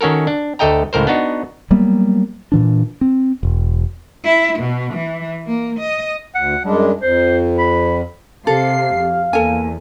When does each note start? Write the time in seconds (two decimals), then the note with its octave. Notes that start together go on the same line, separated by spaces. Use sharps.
0.01 D#3 C#4 F#4 A4 A#4
0.27 D4
0.59 D2 A3 A4 D#5 G5 A#5
0.93 C#2 A2 A#4 C5
1.07 B3 D4 D#4 F#4
1.71 F#3 G3 A#3 B3
2.52 A#2 E3 D4
3.01 C4
3.43 E1
4.24 E4
4.59 B2
4.94 E3
5.46 A#3
5.80 D#5
6.35 D2 F#5
6.65 F#2 G3 G#3 D4
7.01 F2 C5
7.58 B5
8.47 C3 G4 A4 F5 C7
8.95 F2
9.33 E2 A#3 A4 G#5